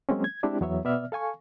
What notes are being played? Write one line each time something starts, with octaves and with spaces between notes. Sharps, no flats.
F#3 G#3 A#3 C4 C#4
G#6
G#3 C4 D4 E4 G4
E2 F#3 B3 C#5 E5
B2 B3 D5 E5 F6
A4 F5 G#5 C#6